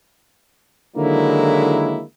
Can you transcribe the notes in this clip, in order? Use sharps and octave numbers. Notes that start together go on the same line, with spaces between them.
D3 D#3 F#3 G#3 A#3 E4